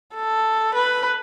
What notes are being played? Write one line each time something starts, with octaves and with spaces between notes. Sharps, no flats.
A4
B4